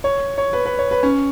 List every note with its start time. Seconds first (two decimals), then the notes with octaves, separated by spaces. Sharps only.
0.04 C#5
0.38 C#5
0.53 B4
0.65 B4
0.79 C#5
0.91 B4
1.03 C#4